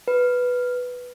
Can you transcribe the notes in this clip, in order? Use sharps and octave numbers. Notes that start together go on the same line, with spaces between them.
B4